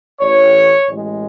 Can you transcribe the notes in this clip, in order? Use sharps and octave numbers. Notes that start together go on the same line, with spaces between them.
A1 A2 E3 C#5
A1 A2 G#3